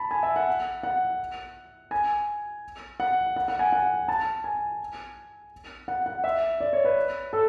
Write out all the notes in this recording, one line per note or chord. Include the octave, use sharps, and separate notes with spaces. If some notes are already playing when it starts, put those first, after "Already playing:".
Already playing: A5 B5
G#5
E5
F#5
F#5
G#5
F#5
F#5
F#5
G#5
F#5
A5
G#5
F#5
F#5
E5
D5
C#5
B4
A4